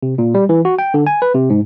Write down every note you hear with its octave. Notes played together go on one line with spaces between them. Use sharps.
C3
A#2
G3
E3
F#4
G5
D3
G#5
B4
C3
G#2